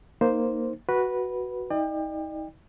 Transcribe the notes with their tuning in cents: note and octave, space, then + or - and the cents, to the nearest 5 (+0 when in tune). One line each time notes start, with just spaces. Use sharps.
A#3 +0 D#4 +0 C5 +0
F#4 +5 B4 -10
D#4 +35 D5 +40 G5 +30